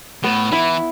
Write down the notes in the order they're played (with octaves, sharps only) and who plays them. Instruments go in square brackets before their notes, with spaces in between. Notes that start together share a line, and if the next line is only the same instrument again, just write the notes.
[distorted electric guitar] A2 [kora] B3
[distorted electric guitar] E3 [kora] E4